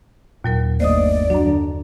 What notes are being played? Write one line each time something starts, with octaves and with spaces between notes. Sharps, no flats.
D#2 A#2 F#3 A#4
G1 A3 A#3 C5 D5 D#5 D#6
F#2 F#3 D4
D3